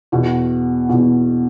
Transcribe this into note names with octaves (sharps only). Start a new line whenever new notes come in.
E2 B2
E2 B2